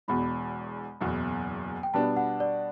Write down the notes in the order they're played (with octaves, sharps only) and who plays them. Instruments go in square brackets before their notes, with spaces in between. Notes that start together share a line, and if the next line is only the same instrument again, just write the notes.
[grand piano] E1 E2 B2 [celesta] B5
[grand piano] F#1 E2 B2
[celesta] G5
[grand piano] B2 G3 B3 D4 [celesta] A5
[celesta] F#5
D5